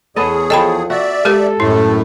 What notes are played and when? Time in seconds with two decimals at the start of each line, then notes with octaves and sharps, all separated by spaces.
0.16 E2 B3 G#4 A4 C#5 D#5
0.50 F3 A4 D#5 G5 B5
0.90 F#4 D5 E5
1.25 G#3 G4 A4 A#4
1.60 F#2 A2 A3 E4